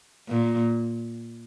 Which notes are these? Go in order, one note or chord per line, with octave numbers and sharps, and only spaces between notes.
A#2